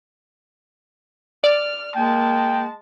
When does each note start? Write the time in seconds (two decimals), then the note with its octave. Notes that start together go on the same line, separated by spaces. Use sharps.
1.44 D5 F6
1.95 G#3 A#3 G5 A5